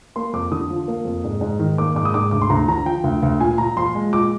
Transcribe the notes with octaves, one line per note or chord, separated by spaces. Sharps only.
A#3 C6
F2 D6
D3 D#6
F3
A#3
F2
G#2
G#2
D#3
A#3 D6
G#2 D6
D#6
G#2 D6
D2 D6
C6
D2 A#5
D3 A#5
F3 G5
D2
D2
A#2 G#5
A#2 A#5
F3 C6
G#3
A#2 D6